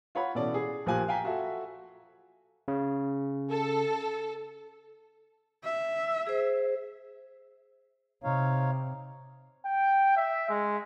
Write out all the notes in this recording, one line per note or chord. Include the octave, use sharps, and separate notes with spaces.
F4 C#5 F#5 B5
B2 E3 C#4 A4 D5
G#4
A#1 F3 A#3 G4 G#5 F#6
F5 G5 G#5 A#5 B6
F4 F#4 A4 E5
C#3
A4
E5
G#4 C5
C3 D#4 C#5 F5
G5
E5
G#3